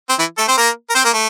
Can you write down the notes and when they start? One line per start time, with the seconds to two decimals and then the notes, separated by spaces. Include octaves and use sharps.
0.10 C4
0.19 E3 E4
0.38 A3 A4
0.48 C4 C5
0.58 A#3 A#4
0.90 A#4
0.95 C4 C5
1.05 A#3 A#4
1.13 A3